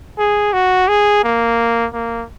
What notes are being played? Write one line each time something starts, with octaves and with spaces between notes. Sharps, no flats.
G#4
F#4
G#4
A#3
A#3